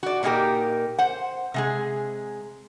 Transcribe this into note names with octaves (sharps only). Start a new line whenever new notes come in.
F#4 D5
A#2 A#3 D#4 E4 G4 A#4
C5 F#5
C3 G#3 G#4